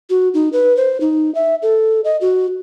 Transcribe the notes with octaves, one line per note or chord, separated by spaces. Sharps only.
F#4
D#4
B4
C5
D#4
E5
A4
D#5
F#4